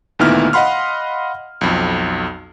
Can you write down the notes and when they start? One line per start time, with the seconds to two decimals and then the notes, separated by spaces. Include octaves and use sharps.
0.19 D2 A#2 D#3 B3 E4 F6
0.53 D#5 F5 F#5 B5 C6 F6
1.61 B1 F2